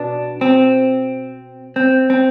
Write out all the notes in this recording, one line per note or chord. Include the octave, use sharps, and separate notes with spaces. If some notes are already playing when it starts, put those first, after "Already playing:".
Already playing: B2 B3 D4
C4
C4
C4